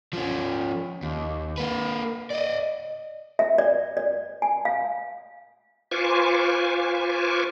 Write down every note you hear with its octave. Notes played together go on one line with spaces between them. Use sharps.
F3 C#4
D#2
A#3 B4
D5 D#5
E5
D5
D5
G#5
F5
F4 B4 C5 G#5 C#6 D6